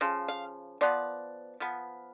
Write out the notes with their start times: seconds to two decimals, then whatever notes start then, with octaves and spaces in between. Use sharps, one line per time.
0.01 C#3 F3
0.28 F5
0.81 F3 B3 D5
1.60 F3 B3